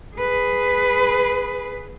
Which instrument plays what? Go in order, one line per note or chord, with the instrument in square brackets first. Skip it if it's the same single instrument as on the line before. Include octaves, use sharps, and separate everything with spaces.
[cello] G#4 B4